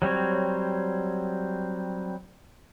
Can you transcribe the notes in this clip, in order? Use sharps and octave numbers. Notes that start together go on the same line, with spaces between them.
F#3 G3 C4 C#5